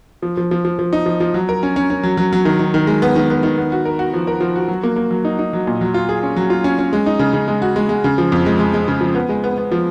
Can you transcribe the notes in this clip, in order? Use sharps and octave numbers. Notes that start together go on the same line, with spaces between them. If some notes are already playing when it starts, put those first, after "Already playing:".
F3
F3
F3
F3
F3
D#4
F3
F3
F#3
A#4
C#4
C#4
C#4
F#3
F#3
F#3
D#3
D#3
D#3
G#3
B3
D#3
B3
D#3
B3
F#4
A#4
F#4
F3
A#4
F3
F#4
F#3
A#3
A#3
F#3
D#4
D#4
F#3
A#2
F#3
F4
G#4
C#4
F#3
F4
C#4
C#4
G#3
D#4
C#3
C#3
G#3
F#4
G#3
G#3
C#3
F3
F2
G#3
G#3
G#3
C#3
F3
B3
G#3
B3
B3
F3